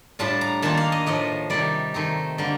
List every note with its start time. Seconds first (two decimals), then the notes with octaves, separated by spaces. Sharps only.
0.19 A2 G3 D4 F4 A5
0.41 A#5
0.62 D#3 A#3 D4 F4 A5
0.77 F5
0.92 D#5
1.06 A2 F3 A3 D#5
1.50 C3 D#3 G3 D5
1.94 D#3 A3 C4 D#4
2.38 D3 G3 A#3